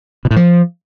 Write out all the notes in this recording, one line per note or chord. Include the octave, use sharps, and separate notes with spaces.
B2
A2
F3